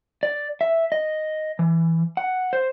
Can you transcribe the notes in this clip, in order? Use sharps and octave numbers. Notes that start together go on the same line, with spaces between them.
D5
E5
D#5
E3
F#5
C5